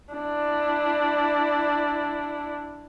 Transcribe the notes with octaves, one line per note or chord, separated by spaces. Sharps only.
D4 E4